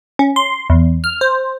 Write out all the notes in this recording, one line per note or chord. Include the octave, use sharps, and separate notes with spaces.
C#4
C6
E2
F6
C5